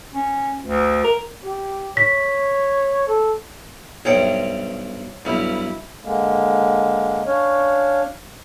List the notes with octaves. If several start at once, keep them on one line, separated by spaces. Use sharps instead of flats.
C#4
D2
A#4
G4
C#5 B6
A4
B1 G2 C5 C#5 E5 G5
B1 G2 E4
D3 G#3 A#3
C#4 D4 C#5 F5